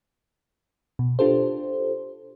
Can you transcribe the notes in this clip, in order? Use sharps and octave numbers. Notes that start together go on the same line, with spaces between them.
B2
D4 F4 G4 A4 C5